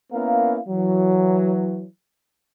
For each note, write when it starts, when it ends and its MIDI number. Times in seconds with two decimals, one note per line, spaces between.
0.13 0.58 58
0.13 0.58 59
0.13 0.58 61
0.13 0.58 64
0.13 0.58 70
0.13 0.58 77
0.69 1.86 52
0.69 1.86 54